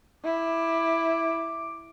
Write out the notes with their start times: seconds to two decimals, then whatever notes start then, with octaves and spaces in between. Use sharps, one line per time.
0.24 E4 D6